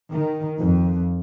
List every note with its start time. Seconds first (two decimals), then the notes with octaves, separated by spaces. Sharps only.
0.10 D#3
0.59 F2